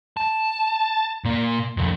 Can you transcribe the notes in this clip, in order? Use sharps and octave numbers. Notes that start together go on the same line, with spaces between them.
A5
A#2 A#3
C2 F2